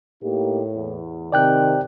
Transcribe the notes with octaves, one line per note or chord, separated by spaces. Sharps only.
A2 A#3 D#4 G4
E2
C3 D#3 D5 G5 F#6